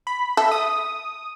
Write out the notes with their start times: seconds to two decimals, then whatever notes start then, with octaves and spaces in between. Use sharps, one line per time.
0.07 B5
0.37 A4 E5
0.52 D#6